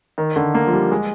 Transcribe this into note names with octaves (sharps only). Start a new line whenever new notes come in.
D#3
D3
A#3
F3
G3
G#3